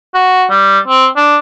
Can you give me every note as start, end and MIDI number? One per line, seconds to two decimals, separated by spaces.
0.15 0.45 66
0.50 0.79 55
0.88 1.07 60
1.16 1.38 62